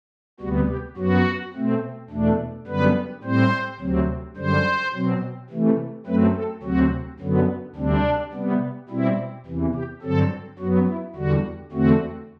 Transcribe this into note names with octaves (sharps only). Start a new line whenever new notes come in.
D2 C3 G3 B3 F#4
G4
F#2 F#3 B3 F#4
B2 A3 C4
E2 B2 A3 D4
F#2 D3 G3 B3 B4
A2 G3 C4 C5
D2 C3 F#3 C4
F#2 D3 G3 C5
B2 F#3 C4
C3 E3 A3
F#2 F#3 A3 C4 B4
A4
D2 C3 F#3 C4 F#4
F#2 D3 F#3 B3
D2 C3 G3 C4 D4
C3 G3 B3
B2 G3 C4 E4
E2 C3 E3
G4
G2 D3 F#3 C4 A4
F#2 F#3 B3 F#4
E4
E2 D3 G3 F#4
E2 D3 A3 C4 F#4